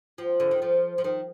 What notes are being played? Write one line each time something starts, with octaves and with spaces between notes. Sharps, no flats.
F3
D3
D#3
F3
F3
D#3